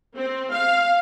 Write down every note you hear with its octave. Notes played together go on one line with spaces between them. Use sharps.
C4
F5